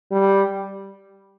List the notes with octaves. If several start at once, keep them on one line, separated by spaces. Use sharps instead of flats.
G3